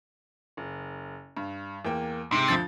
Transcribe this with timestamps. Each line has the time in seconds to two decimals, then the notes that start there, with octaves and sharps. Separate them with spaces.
0.57 F#1
1.37 G2
1.85 E2 A#3 G5
2.32 G#2 C3
2.48 D2 F3 A6